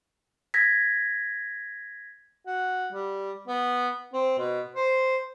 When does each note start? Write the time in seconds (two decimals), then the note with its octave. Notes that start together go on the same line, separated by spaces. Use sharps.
0.54 G#6 A#6 B6
2.46 F#4
2.92 G3
3.48 B3
4.13 C4
4.38 B2
4.75 C5